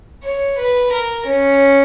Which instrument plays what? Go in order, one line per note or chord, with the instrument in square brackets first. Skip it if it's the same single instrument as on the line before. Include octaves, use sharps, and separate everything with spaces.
[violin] C#5
B4
A#4
C#4